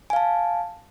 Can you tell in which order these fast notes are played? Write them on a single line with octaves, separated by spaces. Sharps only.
G#5 F5 A5